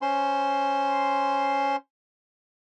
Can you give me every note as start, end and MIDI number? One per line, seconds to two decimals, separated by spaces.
0.02 1.76 61
0.02 1.76 72
0.02 1.76 84